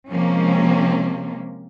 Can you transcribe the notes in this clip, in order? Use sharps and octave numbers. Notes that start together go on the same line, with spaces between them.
C3 F3 G#3 A#3 C4 C#4